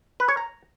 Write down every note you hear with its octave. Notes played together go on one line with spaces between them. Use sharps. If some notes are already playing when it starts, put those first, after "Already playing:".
B4
C#5
A#5